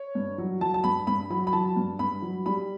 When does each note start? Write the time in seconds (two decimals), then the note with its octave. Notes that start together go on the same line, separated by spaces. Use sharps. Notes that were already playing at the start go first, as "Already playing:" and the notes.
Already playing: C#5
0.15 G2
0.38 F#3
0.61 F#3 A5
0.74 A5
0.84 G2 B5
1.07 G2 B5
1.30 F#3 B5
1.47 B5
1.53 F#3 A5
1.76 G2
1.99 G2 B5
2.22 F#3
2.46 G3 B5